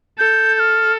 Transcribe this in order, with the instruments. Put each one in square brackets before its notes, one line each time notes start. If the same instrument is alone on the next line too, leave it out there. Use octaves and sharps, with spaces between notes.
[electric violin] A4 [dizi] G6
[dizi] G6
F6